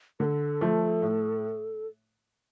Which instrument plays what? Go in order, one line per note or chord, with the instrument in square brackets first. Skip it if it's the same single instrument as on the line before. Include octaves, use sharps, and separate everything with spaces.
[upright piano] D3 [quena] A4 A#4
[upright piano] F3 A3
A2